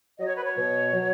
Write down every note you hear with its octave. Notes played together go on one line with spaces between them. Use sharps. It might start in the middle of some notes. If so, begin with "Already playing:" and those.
F#3 D#5
C#5
B4
C#5
B2
F#3